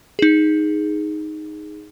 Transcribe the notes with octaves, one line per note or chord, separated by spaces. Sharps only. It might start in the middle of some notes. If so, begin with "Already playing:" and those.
D#4 G#4